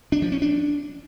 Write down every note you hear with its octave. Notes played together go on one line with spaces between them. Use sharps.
D4
F3
C#4
D4